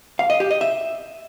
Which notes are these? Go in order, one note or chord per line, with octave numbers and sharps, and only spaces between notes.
F5
D#5
G4
D#5
E5